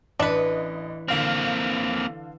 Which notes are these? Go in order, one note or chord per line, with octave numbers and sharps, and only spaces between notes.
A1 E3 D4 B4 D#5 C#7
D3 A#3 C4 F5 F6